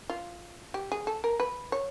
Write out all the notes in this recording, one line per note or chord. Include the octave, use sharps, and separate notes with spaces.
F4
G4
G#4
A4
A#4
B4
C#5